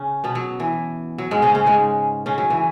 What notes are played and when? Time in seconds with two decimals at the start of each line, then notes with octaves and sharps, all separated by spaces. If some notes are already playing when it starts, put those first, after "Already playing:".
Already playing: C#3 C#4
0.24 B2 B3
0.35 F#3
0.60 E3
1.18 F#3
1.31 G#2 G#3
1.42 C#3 C#4
1.54 C#3 C#4
1.66 G#2 G#3
2.26 C#3 C#4
2.38 F#3
2.50 E3